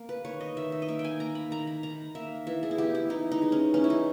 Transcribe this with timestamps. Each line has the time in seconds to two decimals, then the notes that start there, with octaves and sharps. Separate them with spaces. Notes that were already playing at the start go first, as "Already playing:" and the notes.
Already playing: A#3
0.09 B4
0.25 D#3 C#5
0.41 D#5
0.57 D#3 E5
0.72 E5
0.82 D#5
0.88 A#3 E5
0.99 G5
1.04 G#5
1.20 A#3 A#5
1.35 B5
1.51 D#3 A#5
1.67 B5
1.83 D#3 A#5
2.15 A#3 E5
2.47 E3 E5
2.63 G#4
2.71 E4
2.78 B3 G4
2.95 E4
3.10 E3 D#4
3.32 D#4
3.42 G#3
3.52 C#4
3.74 E3 C#4
3.84 E4
3.90 D#4